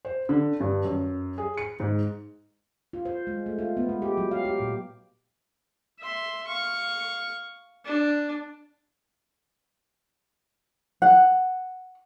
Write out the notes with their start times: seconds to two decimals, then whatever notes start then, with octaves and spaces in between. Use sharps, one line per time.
0.05 C5
0.29 D3
0.60 G2
0.84 F#2
1.38 G#4
1.57 C#7
1.80 G#2
2.93 F4
3.05 C5
3.27 G#3
3.46 A3
3.59 F4
3.77 B3
3.89 G#3
4.02 G4
4.17 F#3
4.31 F5
4.45 G4
4.60 A#2
5.99 E5 C6
6.47 F5 C#6
7.85 D4
11.02 F#5